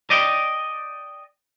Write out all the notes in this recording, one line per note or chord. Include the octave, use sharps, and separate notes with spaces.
D5 D#5 G5